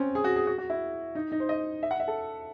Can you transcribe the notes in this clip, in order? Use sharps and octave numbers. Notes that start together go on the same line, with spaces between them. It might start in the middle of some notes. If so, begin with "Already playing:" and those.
Already playing: C4 C#4
G#4
F#4
G#4
F#4
F#4
E4
D#4
D#4
C5
D#5
E5
F#5
E5
A4